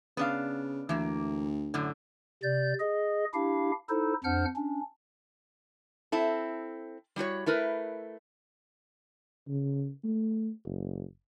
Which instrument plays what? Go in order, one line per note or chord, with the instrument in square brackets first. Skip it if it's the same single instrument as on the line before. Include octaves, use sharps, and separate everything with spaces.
[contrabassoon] C#3 [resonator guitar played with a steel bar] B3 D4 F5
[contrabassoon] D2 [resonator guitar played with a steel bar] E3 A#3
[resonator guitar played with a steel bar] F#2 A2 D3
[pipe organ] C3 D5 G6
G#4 D#5
D4 E4 G4 F5
D#4 E4 A4 C5
F2 D4 C5 F#5 F6 G6
C#4 D4
[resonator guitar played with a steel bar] C4 E4 A4
G3 E4 F#4 C#5
A3 E4 A#4 B4
[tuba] C#3
A3
F#1